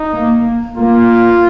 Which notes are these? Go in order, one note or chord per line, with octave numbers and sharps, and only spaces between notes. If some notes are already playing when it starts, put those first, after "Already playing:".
Already playing: D#4
A#3
A#3 F4